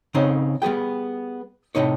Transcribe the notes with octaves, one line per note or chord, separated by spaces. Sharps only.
C#3 C4 C#4 D#4
G3 B3 G#4 G5
A2 C3 D#4 C#5